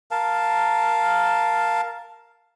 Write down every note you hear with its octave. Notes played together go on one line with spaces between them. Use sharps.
A#4 F5 A5